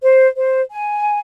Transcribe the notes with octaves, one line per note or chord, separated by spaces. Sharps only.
C5
C5
G#5